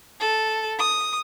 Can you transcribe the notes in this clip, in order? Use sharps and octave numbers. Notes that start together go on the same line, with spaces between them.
A4
D#6